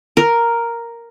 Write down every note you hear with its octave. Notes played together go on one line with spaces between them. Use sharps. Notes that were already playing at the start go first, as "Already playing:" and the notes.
A#4